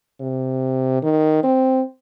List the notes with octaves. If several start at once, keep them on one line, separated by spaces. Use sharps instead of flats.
C3
D#3
C4